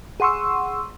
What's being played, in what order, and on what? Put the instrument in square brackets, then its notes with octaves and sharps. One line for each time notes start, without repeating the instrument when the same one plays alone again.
[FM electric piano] G#4 F#5 C6 C#6 E6